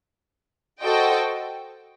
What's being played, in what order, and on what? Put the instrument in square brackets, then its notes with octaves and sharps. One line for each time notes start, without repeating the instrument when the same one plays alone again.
[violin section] F#4 A4 C5 D#5 G5